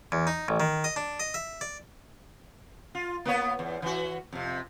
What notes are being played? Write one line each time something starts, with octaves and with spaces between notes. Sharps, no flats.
E2
D#4
A1
D#3
D#5
D4
D#5
E5
D5
F4
A#3 B3 C#5
E2
E3 F#4
F2 C3